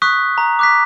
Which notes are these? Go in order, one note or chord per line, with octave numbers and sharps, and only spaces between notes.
C#6 D#6 F#6 B6
A#5
D6 F#6 B6